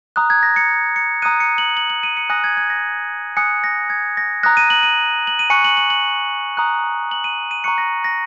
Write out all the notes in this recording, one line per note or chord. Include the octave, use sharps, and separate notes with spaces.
A#5 D#6 F#6
G#6
A#6
C#7
C#7
A#5 D#6 F#6 D#7
C#7
F#7
F#7
F#7
D#7
C#7
G#5 D#6 F#6 A#6
G#6
G#6
A#6
G#5 D#6 F#6 C#7
A#6
G#6
A#6
A#5 D#6 F#6 A#6
D#7
F#7
D#7
F#7
D#7
G#5 C#6 F#6 C#7
F#7
F#7
F#7
A#5 D#6 F#6
F#7
D#7
D#7
A#5 C#6 F#6 C#7
A#6
A#6